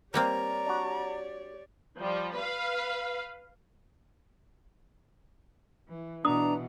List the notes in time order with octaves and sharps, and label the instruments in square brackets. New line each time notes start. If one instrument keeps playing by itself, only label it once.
[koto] G3 A#3 C4 [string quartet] G4 C#5 D5 [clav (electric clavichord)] A#4 [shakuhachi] A#5
[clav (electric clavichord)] D4 F#4
[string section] F3 G3
B4 F5
[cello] E3
[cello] B2 E3 [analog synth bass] D4 [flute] A#5 [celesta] D#6